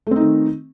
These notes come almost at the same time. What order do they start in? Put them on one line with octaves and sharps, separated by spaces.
A3 C4 D#4 D#3